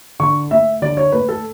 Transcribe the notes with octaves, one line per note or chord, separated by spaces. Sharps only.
D3 C#6
A3 E5
D3 D5
C#5
A3 B4
A4